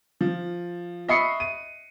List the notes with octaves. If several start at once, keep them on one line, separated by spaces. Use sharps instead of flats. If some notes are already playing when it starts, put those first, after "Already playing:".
F3
D#5 E5 B5 C#6 C7 C#7
D#7